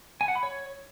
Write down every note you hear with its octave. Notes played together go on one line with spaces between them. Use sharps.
G#5
F#5
B5
C#5